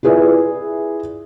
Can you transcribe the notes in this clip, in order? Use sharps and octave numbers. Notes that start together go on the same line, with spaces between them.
E4 F4 G#4 B4 D5 E5